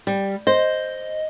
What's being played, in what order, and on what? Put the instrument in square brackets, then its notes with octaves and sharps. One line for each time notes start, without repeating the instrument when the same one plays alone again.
[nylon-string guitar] G3
[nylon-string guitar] C5 [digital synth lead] D#5